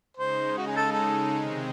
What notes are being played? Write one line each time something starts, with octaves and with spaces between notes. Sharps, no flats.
C#3 G#3 D#4 C5
F#4
G#4
A4
A4
C3 D#3 G#3 C4